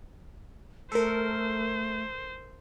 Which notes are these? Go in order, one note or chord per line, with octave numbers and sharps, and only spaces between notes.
A3 A4 A#4 C5